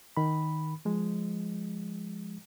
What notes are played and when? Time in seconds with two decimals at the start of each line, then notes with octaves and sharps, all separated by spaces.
0.17 D#3 B5
0.85 F3 G#3